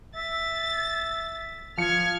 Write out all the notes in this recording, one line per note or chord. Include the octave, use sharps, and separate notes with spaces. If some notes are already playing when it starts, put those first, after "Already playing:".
E5 A6
F3 F6 G#6 C#7